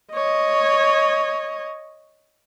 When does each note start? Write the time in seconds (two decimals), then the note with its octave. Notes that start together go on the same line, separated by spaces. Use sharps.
0.14 C#5 D#5